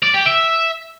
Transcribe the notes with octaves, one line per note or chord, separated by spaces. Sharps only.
D5
G4
E5